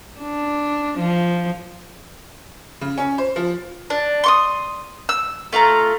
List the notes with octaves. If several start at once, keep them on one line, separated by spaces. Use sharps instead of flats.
D4
F3
C#3
C#4
C5
F3
D4
C6 C#6 D#6
E6
A3 F4 F5 A#5